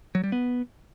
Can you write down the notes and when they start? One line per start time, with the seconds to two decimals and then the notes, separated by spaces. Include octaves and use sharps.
0.15 F#3
0.24 G3
0.32 B3